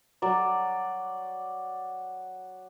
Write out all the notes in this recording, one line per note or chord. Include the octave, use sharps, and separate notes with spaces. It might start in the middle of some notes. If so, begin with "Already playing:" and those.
F#3 D5